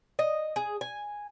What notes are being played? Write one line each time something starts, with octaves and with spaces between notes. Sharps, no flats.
D#5
G#4
G#5